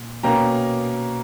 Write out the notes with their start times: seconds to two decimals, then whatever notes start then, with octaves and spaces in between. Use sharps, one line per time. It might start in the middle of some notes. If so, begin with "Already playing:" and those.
Already playing: A#2
0.23 B2 A#3 C#4 G5 A#5